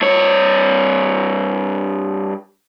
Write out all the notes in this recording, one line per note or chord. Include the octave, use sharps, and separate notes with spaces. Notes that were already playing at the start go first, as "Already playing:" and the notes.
G2 C#5